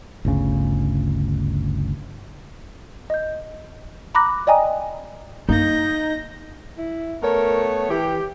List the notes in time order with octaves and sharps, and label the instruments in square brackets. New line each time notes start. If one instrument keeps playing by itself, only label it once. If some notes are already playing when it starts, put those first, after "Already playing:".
[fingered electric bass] G1 D2 C#3
[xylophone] D#5 G6
A#5 B5 D6 F#6 A#6
D5 D#5 G5 G#5 A#5 D#6
[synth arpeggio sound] G2 [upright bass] A#3 [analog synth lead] D#4 [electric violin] G6 A#6
[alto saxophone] E4
[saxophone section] A3 B3 C#5 [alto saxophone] A#4
[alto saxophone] E3 [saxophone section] G4